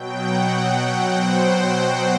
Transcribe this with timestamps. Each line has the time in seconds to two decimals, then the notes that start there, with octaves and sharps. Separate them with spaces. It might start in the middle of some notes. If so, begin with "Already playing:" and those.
Already playing: B2 F#3 G5
0.16 F#5
0.48 G5
0.79 F#5
1.10 C5